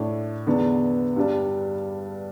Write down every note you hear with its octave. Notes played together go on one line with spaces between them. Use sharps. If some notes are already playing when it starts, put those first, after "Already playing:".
Already playing: A2 A3 D4
E2 D3 B3 D4
G2 G3 D4